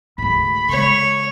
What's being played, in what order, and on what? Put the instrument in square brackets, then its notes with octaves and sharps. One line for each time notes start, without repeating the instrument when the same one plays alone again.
[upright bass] D2 G#2 [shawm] B5
[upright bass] C#3 G#3 [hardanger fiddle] C#5